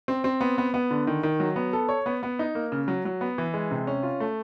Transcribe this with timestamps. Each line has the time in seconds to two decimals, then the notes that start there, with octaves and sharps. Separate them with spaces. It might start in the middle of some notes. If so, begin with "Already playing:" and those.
0.08 C4
0.24 C4
0.41 B3
0.58 B3
0.74 B3
0.91 D3
1.07 D#3
1.23 D#3
1.40 F#3
1.56 B3
1.73 A4
1.89 C#5
2.06 B3
2.23 B3
2.39 D#4
2.55 A#3
2.72 C#3
2.88 F#3
3.05 F#3
3.21 B3
3.38 E3
3.54 G#3
3.71 C3
3.87 C#4
4.03 F4
4.20 A3